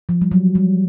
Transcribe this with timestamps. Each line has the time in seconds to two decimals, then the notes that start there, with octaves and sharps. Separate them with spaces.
0.09 F3
0.22 G3
0.31 F#3
0.55 G3